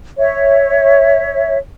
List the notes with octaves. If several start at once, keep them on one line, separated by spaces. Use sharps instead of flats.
C#5 E5